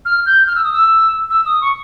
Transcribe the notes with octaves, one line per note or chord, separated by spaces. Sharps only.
F6
G6
F6
E6
D#6
E6
E6
D#6
C#6